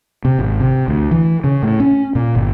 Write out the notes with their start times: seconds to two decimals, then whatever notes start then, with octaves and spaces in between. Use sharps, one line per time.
0.25 C3
0.39 G#1
0.60 C3
0.88 D2
1.11 E3
1.44 C#3
1.63 A2
1.80 C#4
2.15 A#2
2.35 G1